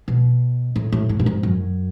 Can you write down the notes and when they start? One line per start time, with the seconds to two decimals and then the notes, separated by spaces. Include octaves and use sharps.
0.08 B2
0.76 A2
0.92 A2
1.09 A2
1.19 A2
1.26 G#2
1.43 F#2